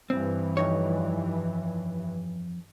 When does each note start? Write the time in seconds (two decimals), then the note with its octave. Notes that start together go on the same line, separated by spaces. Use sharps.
0.10 G2 E3 C4
0.57 F2 D#4 C#5